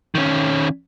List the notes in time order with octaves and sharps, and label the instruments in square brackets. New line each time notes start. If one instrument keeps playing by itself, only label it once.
[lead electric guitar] D#3 C#4